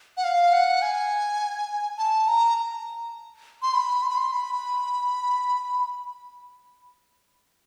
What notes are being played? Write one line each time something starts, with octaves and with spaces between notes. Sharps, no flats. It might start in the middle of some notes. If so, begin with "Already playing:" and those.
F#5
F5
F#5
G#5
A5
A#5
C6
B5
C6
B5
C6
B5